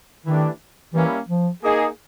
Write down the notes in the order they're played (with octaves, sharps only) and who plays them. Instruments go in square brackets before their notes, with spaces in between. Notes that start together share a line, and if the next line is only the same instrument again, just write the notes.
[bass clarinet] D#3 [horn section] E3 A3 D4 G4
[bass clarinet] E3 [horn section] G3 A#3 C#4 E4
[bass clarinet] F3
[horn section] A#3 D#4 G#4